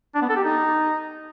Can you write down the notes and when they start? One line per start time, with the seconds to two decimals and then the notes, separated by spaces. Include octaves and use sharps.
0.15 D4
0.22 B3
0.29 A4
0.36 G4
0.43 D#4